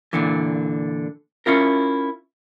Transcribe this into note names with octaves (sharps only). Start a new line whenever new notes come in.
A#2 D3 E3
C#4 E4 F4 A#4